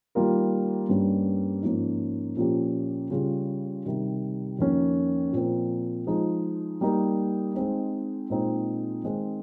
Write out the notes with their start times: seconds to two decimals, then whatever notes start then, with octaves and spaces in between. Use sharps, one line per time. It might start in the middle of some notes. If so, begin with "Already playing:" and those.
0.15 D#3 G3 A#3 F4 A#4
0.89 G2 G3 A#3 C#4
1.63 G#2 F3 A#3 C#4
2.37 A#2 F3 A#3 C#4 G4
3.10 C#3 G3 C#4 F4 G#4
3.85 C3 D#3 G3
4.59 F2 D#3 A#3 C#4
5.33 A#2 F3 C4
6.07 F3 G#3 D#4 G#4
6.81 G3 A#3 D#4 A#4
7.55 G#3 C4 D#4
8.30 A#2 G#3 C4 D#4
9.04 D#3 G#3 C4